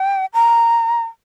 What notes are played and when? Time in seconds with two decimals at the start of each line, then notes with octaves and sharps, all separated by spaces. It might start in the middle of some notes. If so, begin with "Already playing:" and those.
Already playing: G5
0.34 A#5